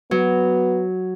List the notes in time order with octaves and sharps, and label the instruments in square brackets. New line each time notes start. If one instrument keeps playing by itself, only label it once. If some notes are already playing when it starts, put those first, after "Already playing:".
[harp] F#3 [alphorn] B3